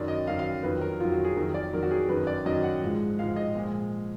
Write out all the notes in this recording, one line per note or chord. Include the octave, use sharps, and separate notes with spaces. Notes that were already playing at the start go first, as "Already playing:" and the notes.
Already playing: F#2 D#3 F#3 D5
D#5
F#2 D#3 F#3 F5
F5
F2 D#3 F#3 B4
A#4
F2 D#3 F#3 F4
F#4
G#4
F2 D#3 F#3 A#4
D5
F2 D#3 F#3 A#4
F#4
G#4
F#2 D#3 F#3 B4
D5
F#2 D#3 F#3 D#5
F#5
G#2 F3 G#3
G#2 F3 G#3 F5
D#5
A#2 F3 G#3